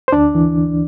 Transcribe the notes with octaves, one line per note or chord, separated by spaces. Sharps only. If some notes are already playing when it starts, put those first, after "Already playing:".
C5
D2 D4 D5
E3